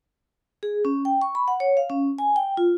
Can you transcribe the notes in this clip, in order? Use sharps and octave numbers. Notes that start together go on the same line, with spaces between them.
G#4
C#4
G5
C#6
B5
F#5
C#5
F5
C#4
G#5
G5
F4